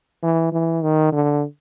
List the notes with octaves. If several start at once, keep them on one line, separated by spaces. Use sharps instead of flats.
E3
E3
D#3
D3